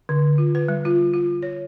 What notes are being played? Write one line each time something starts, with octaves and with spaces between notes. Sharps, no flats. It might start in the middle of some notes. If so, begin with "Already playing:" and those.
D3
F4
B4
G3
F4
F4
C#5